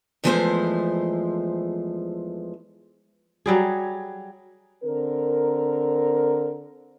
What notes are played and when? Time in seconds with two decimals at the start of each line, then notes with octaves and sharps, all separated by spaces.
0.24 E2 E3 F3 G#3 A3 C5
3.46 F#3 G3 G#4
4.84 D3 C4 A#4